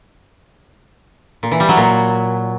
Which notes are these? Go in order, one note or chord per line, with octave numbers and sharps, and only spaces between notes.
A#2
E3
G3
F#3
A#2